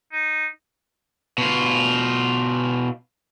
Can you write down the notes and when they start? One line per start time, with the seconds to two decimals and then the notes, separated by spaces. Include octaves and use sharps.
0.12 D#4
1.38 B2 F4